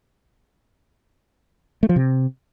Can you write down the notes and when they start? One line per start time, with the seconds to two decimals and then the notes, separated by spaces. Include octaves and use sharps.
1.83 A3
1.89 F3
1.96 C3